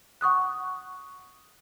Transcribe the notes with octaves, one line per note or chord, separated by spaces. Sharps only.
F#5 C#6 D#6 F#6